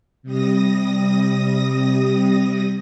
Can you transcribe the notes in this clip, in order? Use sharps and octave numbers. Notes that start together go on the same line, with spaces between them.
C3 G3 D#6 A#6